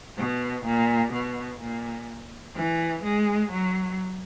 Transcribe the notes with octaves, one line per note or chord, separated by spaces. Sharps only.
B2
A#2
B2
A#2
E3
G#3
F#3